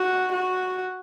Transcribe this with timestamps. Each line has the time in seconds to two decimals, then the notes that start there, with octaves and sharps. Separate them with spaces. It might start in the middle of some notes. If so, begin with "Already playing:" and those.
Already playing: F#4
0.33 F#4